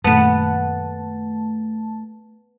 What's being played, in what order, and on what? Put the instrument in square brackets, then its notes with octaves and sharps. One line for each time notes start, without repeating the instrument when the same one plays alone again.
[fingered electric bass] F#2 A#2 D#3 [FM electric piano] A3 A5 [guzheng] B3 B4